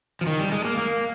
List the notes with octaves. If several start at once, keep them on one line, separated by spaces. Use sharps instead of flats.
F3
D#3
G3
G#3
A#3
A#3